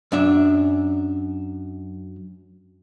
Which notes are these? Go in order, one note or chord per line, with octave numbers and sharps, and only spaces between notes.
F#2 D4 E5